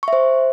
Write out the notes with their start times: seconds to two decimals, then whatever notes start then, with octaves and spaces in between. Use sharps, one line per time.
0.03 C#6
0.08 E5
0.13 C5